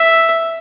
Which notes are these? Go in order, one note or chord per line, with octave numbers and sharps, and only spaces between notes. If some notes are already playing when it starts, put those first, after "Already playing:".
Already playing: E5